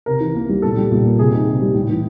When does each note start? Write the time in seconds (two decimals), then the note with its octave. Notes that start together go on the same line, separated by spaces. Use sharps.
0.06 C3 A#4
0.21 E3
0.35 A#3
0.49 G3
0.62 A#2 A4
0.77 G3
0.91 A#2
1.05 A#3
1.18 C3 G#4
1.33 D#3
1.47 C3
1.62 G3
1.74 A2
1.89 E3